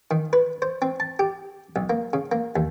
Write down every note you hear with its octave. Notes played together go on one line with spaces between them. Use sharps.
D#3
B4
C5
C4
A5
G4
B1
A#3
C#3
A#3
D#2